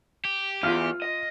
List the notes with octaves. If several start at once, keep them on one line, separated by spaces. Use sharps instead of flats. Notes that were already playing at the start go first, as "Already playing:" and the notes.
G4
E2 F4 F6
D#5